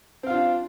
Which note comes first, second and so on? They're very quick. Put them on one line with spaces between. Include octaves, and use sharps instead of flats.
C4 F5 F4 D4